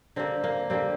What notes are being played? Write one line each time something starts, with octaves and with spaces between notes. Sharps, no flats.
D3 G3 A#3 C4
A#3
D3 G3 A#3 C4